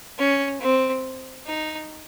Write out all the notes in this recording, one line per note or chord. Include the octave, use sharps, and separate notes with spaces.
C#4
C4
D#4